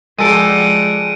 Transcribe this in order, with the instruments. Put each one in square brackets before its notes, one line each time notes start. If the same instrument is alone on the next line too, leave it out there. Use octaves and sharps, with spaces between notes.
[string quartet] F3 G3 F#5 [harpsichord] G#3 A4 [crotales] D7 D#7